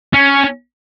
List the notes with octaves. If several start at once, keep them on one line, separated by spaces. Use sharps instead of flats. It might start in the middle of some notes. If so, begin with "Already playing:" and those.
C#4